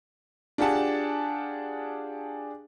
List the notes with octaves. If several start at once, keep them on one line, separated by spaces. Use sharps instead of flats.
D4 F4 G4 G#4 F#5 A5